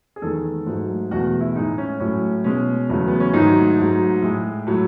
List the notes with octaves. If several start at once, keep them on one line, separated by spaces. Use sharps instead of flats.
G#4
E2 D#3 G#3 A4
G#2 F#3 A3
E2 B2 A3 F#4
E4
A2 G#3 D#4
C#4
A2 F#3 A3 C#4
B2 G#3 C#4
E2 C#3 F#3 A3
B3
C#4
G#2 D#3 F#3 A3 D#4
G#2 F#3 A3
A2 G#3
A2 F#3 A3